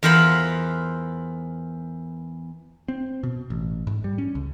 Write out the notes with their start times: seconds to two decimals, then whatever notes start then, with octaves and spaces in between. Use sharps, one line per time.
0.03 E2 F4 A#4 C5 F#5 B5
2.88 C4
3.23 B2
3.50 A1
3.87 G#2
4.04 G3
4.18 C#4
4.35 C#2